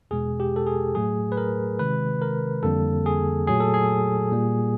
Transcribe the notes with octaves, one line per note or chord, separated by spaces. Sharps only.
E2 B2 G#3 G#4
G4
A4
G#4
A2 F#3 A3 G#4
B4
A#4
C3 D#3 G#3 B4
A#4
F2 D3 G3 A#3 A4
G#4
A#2 F#3 A3 G#4
A4
G#4
A#2 G3 A#3